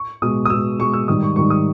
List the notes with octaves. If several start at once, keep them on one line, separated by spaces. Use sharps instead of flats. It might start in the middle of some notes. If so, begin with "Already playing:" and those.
Already playing: C#6
B2 G#3 D#6
D#6
B2 G#3 E6
B2 G#3 C#6
E6
G#2 D#3 G3 D#6
C#6
G#2 D#3 G3 C#6
D#6